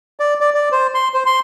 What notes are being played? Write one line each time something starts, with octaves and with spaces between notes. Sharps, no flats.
D5
D5
D5
C5
C6
C5
C6